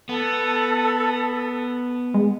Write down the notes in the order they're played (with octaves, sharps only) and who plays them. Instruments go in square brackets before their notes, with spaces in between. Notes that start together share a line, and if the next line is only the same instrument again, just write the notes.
[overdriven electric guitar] B3 [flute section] A4 A5
[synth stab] G#3